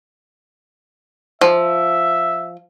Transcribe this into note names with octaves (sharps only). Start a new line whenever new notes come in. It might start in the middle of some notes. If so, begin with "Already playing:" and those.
F3 E5